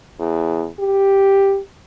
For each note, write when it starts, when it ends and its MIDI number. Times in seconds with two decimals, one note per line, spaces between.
0.19 0.67 40
0.79 1.59 67